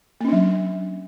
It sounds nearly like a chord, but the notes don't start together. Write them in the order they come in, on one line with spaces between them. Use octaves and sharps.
A#3 C#4 D4 F#3